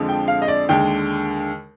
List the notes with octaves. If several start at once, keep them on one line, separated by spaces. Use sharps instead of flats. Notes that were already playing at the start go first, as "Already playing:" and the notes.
Already playing: F2 D3 F3 G#3
G5
F5
D#5
D5
D#2 D3 G#3 G5